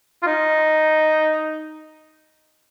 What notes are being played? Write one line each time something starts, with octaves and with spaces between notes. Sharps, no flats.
F4
D#4